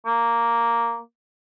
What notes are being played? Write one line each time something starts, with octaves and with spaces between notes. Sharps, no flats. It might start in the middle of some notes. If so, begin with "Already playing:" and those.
A#3